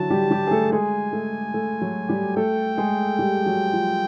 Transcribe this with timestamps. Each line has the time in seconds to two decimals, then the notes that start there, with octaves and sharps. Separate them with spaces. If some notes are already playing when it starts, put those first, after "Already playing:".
Already playing: D3 E3 F#3 E4 F#4 A5
0.10 G3 G4
0.30 G3 G4
0.47 G#4
0.51 A3 A4
0.72 G#3 G#4 G#5
1.13 A3 A4
1.54 A3 A4
1.81 F#3 F#4
2.08 G3 G4
2.36 A3 A4 G5
2.77 G#3 G#4
3.19 G3 G4
3.46 F#3 F#4
3.73 F3 F4